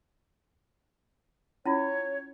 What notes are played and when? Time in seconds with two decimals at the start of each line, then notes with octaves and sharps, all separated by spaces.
1.66 C#4 E4 F4 C#5